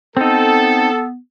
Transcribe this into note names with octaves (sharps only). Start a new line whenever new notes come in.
B3 C4 D#4 A4